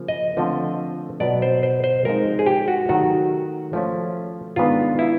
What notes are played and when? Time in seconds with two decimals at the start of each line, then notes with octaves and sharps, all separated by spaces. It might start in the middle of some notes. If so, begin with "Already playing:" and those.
Already playing: C#3 F3 A#3
0.08 D#5
0.37 D3 F3 A3 C4
1.20 B2 F#3 B3 D5
1.42 C5
1.63 C5
1.84 C5
2.05 F3 G#3 C4 D#4 A#4
2.39 G#4
2.46 G4
2.68 F#4
2.89 D#3 F#3 A3 F#4
3.73 F3 A3 C#4
4.56 D#3 G#3 B3 D4 F4
4.99 E4